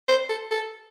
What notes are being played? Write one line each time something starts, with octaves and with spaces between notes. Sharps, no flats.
C5
A4
A4